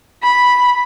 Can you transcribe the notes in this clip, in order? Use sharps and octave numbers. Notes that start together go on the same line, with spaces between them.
B5